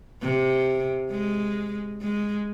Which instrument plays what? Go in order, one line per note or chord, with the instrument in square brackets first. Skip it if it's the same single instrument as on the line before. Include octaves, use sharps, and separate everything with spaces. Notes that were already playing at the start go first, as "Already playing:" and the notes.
[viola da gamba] C3
G#3
G#3